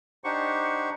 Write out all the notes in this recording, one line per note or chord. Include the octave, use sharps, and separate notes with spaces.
D4 D#4 G4 C5 F#5 C#6